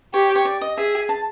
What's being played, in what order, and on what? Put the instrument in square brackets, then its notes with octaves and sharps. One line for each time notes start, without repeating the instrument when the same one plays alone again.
[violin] G4 [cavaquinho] C#5
[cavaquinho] C#5
D5
D#5
[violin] G#4 [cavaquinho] E5
[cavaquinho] A5